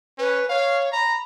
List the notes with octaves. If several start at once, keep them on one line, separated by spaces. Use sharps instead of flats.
C#4 B4
C#5 F5
A#5 B5